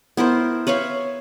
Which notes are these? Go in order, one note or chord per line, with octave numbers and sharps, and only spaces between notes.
B3 E4 A#4 C5
B4 C#5 E5 F5